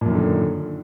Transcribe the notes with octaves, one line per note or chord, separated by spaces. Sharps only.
F#2 A#2 D3 D#3